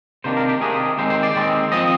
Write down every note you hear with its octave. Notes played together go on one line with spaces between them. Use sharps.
C3 D#3 A#3 D4 C5
A#4
G4
C3 D#3 A#3 D4 G#4
D#2 D#3 G#3 C4 C5
C5
D5
D#2 D#3 G#3 C4
F3 C4 D#5